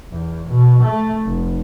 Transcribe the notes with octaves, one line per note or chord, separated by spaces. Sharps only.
E2
B2
A3
F1